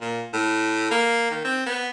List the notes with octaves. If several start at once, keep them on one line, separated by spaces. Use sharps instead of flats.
A#2
A2
A#3
D#3
C4
B3